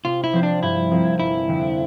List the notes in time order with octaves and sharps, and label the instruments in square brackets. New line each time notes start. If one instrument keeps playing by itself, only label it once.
[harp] C3 [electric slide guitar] F4
[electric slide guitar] E4
[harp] F3 C4 F4 C5
[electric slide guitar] D4
[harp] G2 [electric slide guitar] E4
[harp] F3 C4 F4 A#4
[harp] G1 [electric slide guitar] E4
[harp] F2 D3 F3